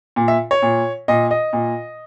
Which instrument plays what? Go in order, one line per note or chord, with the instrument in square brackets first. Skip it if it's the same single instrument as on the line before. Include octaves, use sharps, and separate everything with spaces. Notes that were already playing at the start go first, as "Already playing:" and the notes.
[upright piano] A#2
E5
C#5
A#2
A#2 D#5
D#5
A#2